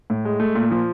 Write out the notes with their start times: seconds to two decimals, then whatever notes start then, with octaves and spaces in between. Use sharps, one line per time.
0.10 A2
0.25 G#3
0.40 A3
0.55 A#2
0.71 F3